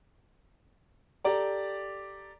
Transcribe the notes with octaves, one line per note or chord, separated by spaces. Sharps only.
G4 A4 D5 A#5